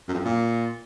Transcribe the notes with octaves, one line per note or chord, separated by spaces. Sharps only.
F#2
F2
F#2
A#2